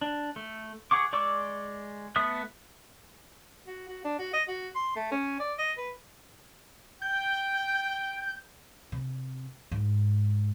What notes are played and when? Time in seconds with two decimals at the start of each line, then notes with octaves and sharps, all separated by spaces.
0.01 D4
0.36 A3
0.91 G#4 F#5 C#6 D6
1.13 G#3 D5 C#6 D6 E6
2.16 A3 B3 E5 D#6 F#6
3.66 F#4
3.88 F#4
4.04 D4
4.19 F#4
4.33 D#5
4.48 F#4
4.75 C6
4.96 A3
5.11 C#4
5.39 D5
5.58 D#5
5.77 B4
7.02 G5 G6
8.92 C3
9.72 G#2